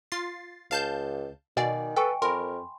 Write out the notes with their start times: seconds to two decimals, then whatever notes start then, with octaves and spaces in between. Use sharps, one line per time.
0.12 F4 A6 C7
0.71 C#2 F5 A5 G6
1.57 B2 D#3 D5 D#5 F#5 G#5
1.96 A4 B4 G5 G#5 C#6
2.22 F2 A#4 B5 C6